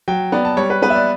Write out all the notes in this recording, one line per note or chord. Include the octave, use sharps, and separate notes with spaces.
F#3 G5
B3 D5
A5
G3 C#5
B4
B3 B4
E5
D5